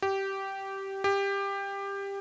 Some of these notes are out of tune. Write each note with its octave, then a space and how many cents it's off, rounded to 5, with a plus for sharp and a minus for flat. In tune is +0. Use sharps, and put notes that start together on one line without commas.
G4 -15
G4 +15